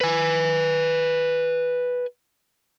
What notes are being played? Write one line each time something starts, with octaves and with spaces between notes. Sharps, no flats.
B4 G#5